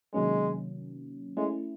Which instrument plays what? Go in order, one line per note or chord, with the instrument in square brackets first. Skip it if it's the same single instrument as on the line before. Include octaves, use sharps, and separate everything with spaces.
[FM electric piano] C3 D#3 F#3 A#3 C#4 [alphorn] G#3
[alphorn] G#3 [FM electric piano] A3 C#4 E4